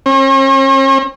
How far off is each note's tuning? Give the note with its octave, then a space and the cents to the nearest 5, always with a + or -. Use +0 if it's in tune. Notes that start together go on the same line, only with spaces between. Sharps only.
C#4 -45